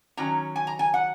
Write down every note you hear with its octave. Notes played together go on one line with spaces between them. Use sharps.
D#3 F#3 C#4 A#5
G#5
A#5
G#5
F#5